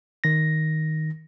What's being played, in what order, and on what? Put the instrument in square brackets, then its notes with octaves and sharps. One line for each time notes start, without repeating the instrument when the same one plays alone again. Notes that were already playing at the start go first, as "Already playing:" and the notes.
[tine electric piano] D#3 A#6